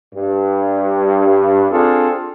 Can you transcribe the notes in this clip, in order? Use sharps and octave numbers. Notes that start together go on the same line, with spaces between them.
G2
C4 D4 F4 G#4 A4